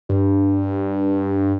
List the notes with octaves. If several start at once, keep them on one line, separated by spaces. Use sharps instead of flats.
G2